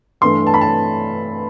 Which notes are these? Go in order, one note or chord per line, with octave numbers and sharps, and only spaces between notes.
G2 E3 A3 C6
A5
B5
A5